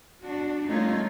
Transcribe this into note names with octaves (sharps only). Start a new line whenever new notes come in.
D4 F#4
G3 A3 A#3 C#4 D#4 F4